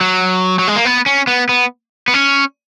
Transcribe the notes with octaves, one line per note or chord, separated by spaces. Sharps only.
F#3
F#3
G#3
A#3
B3
C#4
B3
B3
B3
C#4